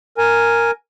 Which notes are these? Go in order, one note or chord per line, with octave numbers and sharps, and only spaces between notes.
A#4 G#5